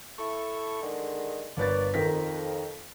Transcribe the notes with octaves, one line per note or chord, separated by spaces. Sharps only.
E4 A4 C#6
D3 D#3 G#3
G1 A#3 B4 C#5 D5 A6
F2 D#3 A#4 B6